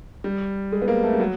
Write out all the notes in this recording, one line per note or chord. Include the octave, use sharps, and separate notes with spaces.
G3
G#3
B3
A#3
A3
G3
F#3